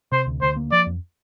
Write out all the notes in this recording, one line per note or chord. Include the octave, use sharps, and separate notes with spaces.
C3 C5
D2
D2 C5
A#3
F3 D5
F2